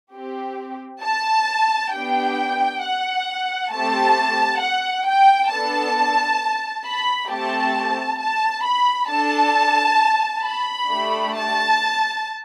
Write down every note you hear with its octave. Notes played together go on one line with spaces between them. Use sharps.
C4 G4
A5
B3 D4 G4 G5
F#5
A3 C4 G4 A5
F#5
G5
B3 D4 A4 A5
B5
A3 C4 G4 A5
A5
B5
D4 A4 A5
B5
A3 D4 G4
A5